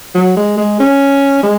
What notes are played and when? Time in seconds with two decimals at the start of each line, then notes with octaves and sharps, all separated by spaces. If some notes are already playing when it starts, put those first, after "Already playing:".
0.15 F#3
0.37 G#3
0.57 G#3
0.80 C#4
1.43 G#3